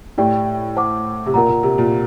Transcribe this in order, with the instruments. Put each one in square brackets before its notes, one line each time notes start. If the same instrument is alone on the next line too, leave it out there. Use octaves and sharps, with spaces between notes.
[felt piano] A2 [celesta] G4 D5 G5
[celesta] C5 F#5 A5 D6
[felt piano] C3
[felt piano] A#2 [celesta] A#4 F#5 A#5
[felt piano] A#2
C3
A#2